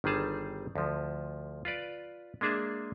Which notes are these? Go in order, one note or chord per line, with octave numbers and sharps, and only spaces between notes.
G1 D#3 G3 G#4 A5
D2 F3
F4 B4 D5
G#3 A#3 D4 G#4 E5